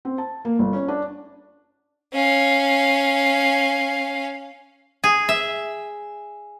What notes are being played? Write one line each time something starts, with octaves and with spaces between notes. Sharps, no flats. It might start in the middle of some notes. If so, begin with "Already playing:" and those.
C4
A5
A#3
G1
C#4
D4
C#4 F5
G#4
E5